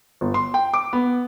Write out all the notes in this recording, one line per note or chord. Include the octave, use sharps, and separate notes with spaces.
G1
C6
G5
D6
B3